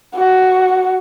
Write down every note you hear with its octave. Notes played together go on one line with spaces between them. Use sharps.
F#4